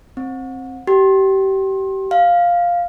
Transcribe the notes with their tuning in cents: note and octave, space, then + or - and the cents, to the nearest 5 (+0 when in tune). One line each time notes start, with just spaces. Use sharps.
C4 +15
G4 -25
F5 +0